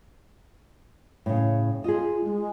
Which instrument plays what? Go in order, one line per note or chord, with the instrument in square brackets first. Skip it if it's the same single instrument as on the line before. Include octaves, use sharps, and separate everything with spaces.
[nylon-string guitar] A2 C#3
[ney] F4 [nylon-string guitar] G#4 D#5
[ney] G#3